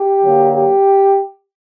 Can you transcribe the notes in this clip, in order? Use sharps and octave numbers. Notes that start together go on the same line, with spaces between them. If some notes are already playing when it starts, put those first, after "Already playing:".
Already playing: G4
D3 F#3 A#3
G4